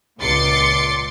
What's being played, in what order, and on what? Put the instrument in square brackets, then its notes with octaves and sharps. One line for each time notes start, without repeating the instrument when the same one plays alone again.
[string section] C#2 A#2 C6 D6 A6 C#7